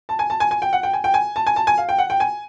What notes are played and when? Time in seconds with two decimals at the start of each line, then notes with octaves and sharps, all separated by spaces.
0.09 A5
0.19 G#5
0.30 A5
0.40 G#5
0.51 G#5
0.62 G5
0.73 F#5
0.83 G5
0.93 G#5
1.04 G5
1.14 G#5
1.36 A5
1.47 G#5
1.56 A5
1.67 G#5
1.78 F5
1.89 G5
1.98 F#5
2.10 G5
2.20 G#5